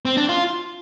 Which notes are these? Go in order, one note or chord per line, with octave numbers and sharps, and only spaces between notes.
C4
D4
F4